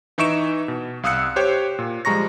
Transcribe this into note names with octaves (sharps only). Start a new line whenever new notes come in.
E3 D#4 E5 C#6 D7 E7
B2
C2 F5 D#6 E6 F#6 C#7
G4 C5 C#5 G5
A#2
F3 G3 G#3 A#5 C#6 A#6